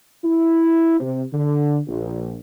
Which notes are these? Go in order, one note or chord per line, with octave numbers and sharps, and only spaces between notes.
E4
C3
D3
A#1